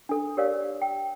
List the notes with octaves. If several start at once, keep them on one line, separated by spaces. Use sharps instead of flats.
D4 A4
G4 A#4 C#5 D5 F5
G5